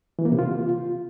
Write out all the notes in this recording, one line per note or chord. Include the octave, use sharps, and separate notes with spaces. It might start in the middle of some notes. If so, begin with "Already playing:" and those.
E3
A#3
C3
F4